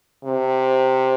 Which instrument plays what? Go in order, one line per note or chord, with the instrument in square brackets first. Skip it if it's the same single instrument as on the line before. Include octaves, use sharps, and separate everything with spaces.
[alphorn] C3